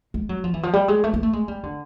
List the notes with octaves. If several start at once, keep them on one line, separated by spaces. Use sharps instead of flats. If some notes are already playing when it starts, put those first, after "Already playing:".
G#3
F#3
F3
E3
F3
G3
G#3
A3
A#3
A3
G#3
G3
D3